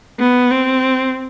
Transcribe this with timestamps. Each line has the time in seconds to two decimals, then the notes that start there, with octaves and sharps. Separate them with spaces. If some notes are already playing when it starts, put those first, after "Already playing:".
0.19 B3
0.51 C4